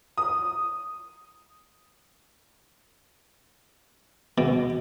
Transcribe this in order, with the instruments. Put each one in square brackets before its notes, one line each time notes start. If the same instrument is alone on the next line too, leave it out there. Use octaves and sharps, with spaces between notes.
[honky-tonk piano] D#6
[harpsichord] B2